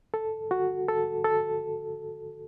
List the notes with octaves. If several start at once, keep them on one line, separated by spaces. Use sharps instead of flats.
A4
F#4
A4
A4